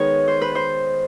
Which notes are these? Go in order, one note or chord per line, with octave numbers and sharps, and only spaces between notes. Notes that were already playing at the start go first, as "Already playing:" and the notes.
Already playing: D#3 G#3 B3 D#4 C#5
C5
B4
C5